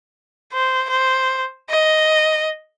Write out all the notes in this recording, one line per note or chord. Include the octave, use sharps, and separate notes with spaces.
C5
C5
D#5